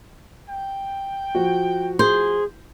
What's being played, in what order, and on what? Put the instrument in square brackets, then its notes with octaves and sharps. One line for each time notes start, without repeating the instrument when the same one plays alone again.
[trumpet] G5
[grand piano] F3 F#4
[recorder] G#4 [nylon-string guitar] C5